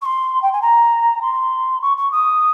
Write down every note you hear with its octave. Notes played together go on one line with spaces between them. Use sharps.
C#6
C6
G5
G#5
A#5
C6
C#6
C#6
D#6